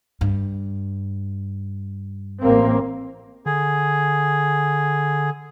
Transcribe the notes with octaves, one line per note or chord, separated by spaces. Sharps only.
G2
A1 A#3 C4
D3 G#4